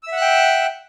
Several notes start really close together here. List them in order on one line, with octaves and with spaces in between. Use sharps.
E6 E5 F#5 F#6 G5